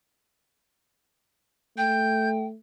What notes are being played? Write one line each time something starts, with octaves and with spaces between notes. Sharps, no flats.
A3 G5 G6